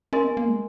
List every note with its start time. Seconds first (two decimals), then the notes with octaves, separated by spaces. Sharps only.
0.13 C#4 A#4 D#5 G#5 C6
0.24 B3
0.37 A#3
0.48 G#3